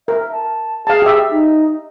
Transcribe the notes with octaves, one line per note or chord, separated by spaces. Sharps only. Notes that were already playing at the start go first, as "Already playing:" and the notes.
A#4 E5
A5
G#4 F5 A5
G4 E5
D#4